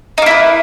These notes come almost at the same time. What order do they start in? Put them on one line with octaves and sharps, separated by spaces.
D#4 A#3 E4 B4